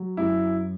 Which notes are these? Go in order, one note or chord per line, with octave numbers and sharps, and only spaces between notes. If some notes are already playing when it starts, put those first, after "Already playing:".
Already playing: F#3
F#2 E4